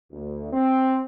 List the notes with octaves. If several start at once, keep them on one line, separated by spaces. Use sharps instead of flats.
D2
C4